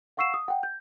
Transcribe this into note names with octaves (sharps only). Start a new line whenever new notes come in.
F5 F#5 C#6 E6 C7 E7
D#6
F#5 G5
G6